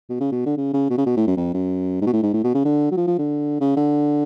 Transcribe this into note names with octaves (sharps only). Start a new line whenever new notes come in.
B2
C#3
B2
D3
C#3
C#3
B2
C#3
B2
A2
F#2
F2
F#2
G#2
B2
A2
G#2
A2
B2
C#3
D3
F#3
F3
F3
D3
C#3
D3